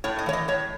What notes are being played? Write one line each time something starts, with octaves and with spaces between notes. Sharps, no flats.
A2 C#5
D#5
E3 C#5
D#5
A2 C#5